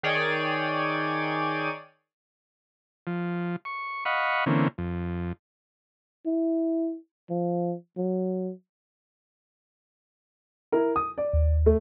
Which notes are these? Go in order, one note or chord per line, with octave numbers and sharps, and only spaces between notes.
D#3 G#4 C#5 D5 G5 D#7
F3
C#6
D#5 F5 F#5 B5 C#6
D3 E3 A#3 C4 C#4
F2
E4
F3
F#3
E4 A#4
D#6
D5
D#2
A3